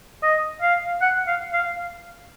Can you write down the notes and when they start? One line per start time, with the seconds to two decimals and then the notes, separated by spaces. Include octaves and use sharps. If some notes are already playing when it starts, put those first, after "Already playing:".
0.23 D#5
0.62 F5
1.02 F#5
1.27 F5
1.53 F5